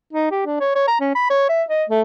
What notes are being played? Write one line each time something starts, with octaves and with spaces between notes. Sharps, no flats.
D#4
G4
D4
C#5
C#5
A#5
C#4
B5
C#5
E5
D#5
A3